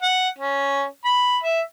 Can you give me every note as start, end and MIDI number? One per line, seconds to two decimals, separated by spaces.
0.02 0.28 78
0.39 0.84 61
1.05 1.38 83
1.43 1.61 76